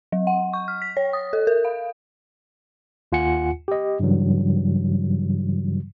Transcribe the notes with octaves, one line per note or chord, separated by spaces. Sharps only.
F#3
F#5
C#6
F6
B6
C#5
D#6
A4
A#4
F5
D#2 F4 F#5 G#5 C#7
G4 D#5
G2 C#3 E3 F#3 G3